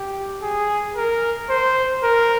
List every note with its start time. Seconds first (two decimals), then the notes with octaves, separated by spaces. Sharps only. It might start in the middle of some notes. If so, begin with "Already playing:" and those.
Already playing: G4
0.43 G#4
0.97 A#4
1.50 C5
2.03 A#4